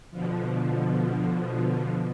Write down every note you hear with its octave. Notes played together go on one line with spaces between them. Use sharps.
B2 D3 F3